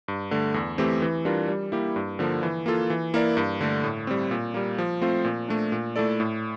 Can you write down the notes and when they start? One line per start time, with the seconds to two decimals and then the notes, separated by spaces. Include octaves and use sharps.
0.08 G2
0.31 D3 A3
0.54 E2
0.78 E3 A3 C4 G4
1.02 E3
1.25 G3 D4 F4 A#4
1.48 G3
1.72 A#3 E4 G4
1.96 G2
2.19 D3 F3 A#3
2.43 E3
2.66 A#3 F4 A4
2.90 E3
3.14 A#3 E4 A#4 D5
3.37 G2
3.61 D3 A3
3.84 A2
4.07 G3 C4
4.31 A#2
4.54 G3 A#3
4.78 F3
5.01 A3 C4 F4 C5
5.25 A#2
5.48 A3 D4
5.72 A#2
5.96 A3 E4 A4 D5
6.20 A2